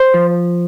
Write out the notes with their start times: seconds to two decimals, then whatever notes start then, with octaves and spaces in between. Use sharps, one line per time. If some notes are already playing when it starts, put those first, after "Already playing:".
Already playing: C5
0.14 F3